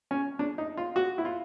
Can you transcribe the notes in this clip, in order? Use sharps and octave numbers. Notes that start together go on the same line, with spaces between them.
C#4
D4
D#4
F4
F#4
E4
F4